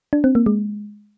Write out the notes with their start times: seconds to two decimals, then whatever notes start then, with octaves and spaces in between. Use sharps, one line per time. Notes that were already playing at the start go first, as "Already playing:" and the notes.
0.13 D4
0.24 C4
0.35 A#3
0.46 G#3